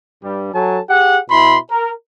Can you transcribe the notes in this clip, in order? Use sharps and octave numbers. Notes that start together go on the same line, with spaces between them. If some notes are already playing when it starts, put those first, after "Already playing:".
G2 G3
F#3 A4 G#5 A5
G4 G#4 F#5
B2 E4 B5 C6
A#4